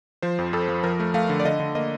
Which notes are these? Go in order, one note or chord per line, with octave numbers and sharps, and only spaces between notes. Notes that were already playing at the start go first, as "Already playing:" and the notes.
F3 C5
F2
F2 A4
F3
F3 A#4
A3
A3 F5
D3
D5
D3 D#5
D3
A#3 D#5